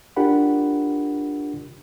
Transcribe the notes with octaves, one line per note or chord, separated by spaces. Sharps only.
D4 F4 G4 A#4 F#5 B5